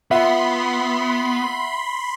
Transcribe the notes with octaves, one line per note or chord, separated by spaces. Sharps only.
B3 F4 E5 F#5 B5 C6